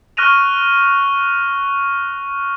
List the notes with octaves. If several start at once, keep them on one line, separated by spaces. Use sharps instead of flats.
C#6 F6 F#6 A#6 D#7 F7